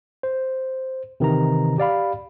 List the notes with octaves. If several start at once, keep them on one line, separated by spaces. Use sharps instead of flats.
C5
C3 D#3 E3 A#5
G4 D5 F5 B5